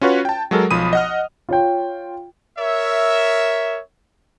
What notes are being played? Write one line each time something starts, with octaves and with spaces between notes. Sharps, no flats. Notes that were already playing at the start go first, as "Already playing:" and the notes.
C#4 F4 F#4 B4 C#5
G5 A5
F#3 G#3 A4 A#4
B1 F3 B5 D#6 D#7
D#5 F#5 F6
F4 C#5 G5
A#4 C#5 E5